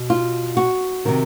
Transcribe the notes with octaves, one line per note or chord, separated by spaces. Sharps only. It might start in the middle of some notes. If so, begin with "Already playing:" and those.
Already playing: B2
F4
F#4
C3 D#3